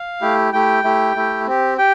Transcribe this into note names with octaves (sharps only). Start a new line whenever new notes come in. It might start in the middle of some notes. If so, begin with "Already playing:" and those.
Already playing: F5
A3 E4 G4
A3 E4 G4 G5
A3 E4 G4
A3 E4 G4
C4 G4
G4 G5